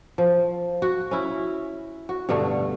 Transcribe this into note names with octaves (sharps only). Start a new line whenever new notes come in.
F3
F#4
C#4 E4
F#4
G2 B2 D3 A3